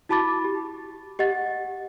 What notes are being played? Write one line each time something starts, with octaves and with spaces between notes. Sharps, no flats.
E4 F#4 A5 B5 D6 A6
G4
G4 D#5 F#5 A6